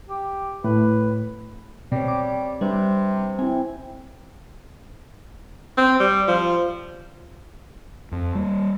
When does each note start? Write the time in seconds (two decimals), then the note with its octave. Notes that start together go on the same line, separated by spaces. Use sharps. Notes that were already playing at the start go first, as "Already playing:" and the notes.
0.09 G4
0.64 A2 B4
1.92 B2 G3 C4 C#5
2.08 D6
2.61 C3 G3 D4 B4
3.39 C4 E4 G#5
5.77 C4
6.00 G3
6.28 F3
8.12 F2
8.35 G3 A#3